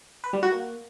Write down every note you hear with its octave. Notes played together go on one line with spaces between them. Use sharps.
B4
G3
F#4
A#3